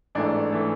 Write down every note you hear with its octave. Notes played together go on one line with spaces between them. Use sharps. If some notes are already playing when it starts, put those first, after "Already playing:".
A1 G#2 E3 A3 D4
E3 A3